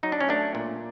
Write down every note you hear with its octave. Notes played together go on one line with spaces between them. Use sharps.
F#3 D#4
D4
C#4
A3 D4
A#2